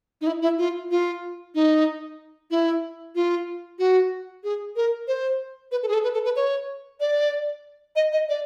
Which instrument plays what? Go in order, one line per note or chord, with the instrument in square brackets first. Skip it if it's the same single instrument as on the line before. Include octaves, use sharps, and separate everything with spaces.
[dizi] D#4
E4
E4
F4
F4
D#4
E4
F4
F#4
G#4
A#4
C5
B4
A4
G#4
A4
B4
A4
B4
C#5
D5
D#5
D#5
D5